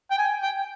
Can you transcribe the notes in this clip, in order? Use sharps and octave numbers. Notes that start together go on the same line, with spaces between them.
G5
G#5
G5